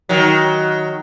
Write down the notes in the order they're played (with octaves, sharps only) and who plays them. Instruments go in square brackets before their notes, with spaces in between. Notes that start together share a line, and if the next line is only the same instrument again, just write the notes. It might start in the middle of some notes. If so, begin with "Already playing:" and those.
[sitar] D#3 F#3